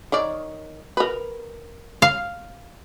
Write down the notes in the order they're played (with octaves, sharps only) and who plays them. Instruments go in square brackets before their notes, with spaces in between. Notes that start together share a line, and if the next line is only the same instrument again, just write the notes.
[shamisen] D#3 C#5 D5
A#4 B4
[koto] F5